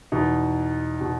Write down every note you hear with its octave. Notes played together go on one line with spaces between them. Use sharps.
E2 B2 D#4
B2